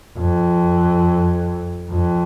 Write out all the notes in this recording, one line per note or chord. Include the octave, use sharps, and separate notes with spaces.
F2
F2